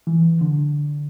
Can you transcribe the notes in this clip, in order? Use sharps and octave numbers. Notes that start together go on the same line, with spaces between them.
E3
D3